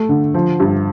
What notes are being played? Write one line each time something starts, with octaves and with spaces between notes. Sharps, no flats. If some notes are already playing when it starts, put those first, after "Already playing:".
Already playing: A3
D3
F3
G2